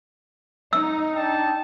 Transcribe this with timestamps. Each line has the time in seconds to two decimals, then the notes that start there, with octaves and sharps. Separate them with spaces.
0.73 D#4 E6
1.14 D4 G5 A5